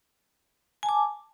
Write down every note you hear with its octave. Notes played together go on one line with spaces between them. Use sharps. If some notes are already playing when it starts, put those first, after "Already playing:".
G#5 A5 D6